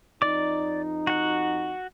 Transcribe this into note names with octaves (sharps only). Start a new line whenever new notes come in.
F2 D#4 D5 D6
F#4 F#5